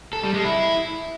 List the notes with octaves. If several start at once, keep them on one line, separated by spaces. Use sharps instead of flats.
A4
G3
G#3
E4